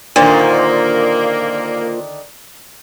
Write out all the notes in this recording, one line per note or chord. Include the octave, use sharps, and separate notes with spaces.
A#2 D3 D#3 A#3 D4 C5